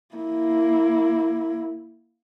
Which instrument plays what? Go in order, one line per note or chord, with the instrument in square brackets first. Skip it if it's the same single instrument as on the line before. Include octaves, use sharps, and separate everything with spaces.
[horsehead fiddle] A#3 E4